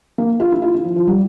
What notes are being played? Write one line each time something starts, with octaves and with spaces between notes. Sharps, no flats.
A#3
F4
E4
F4
E4
F3
F3
G3